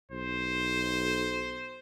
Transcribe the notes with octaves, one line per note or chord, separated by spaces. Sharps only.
B1 C5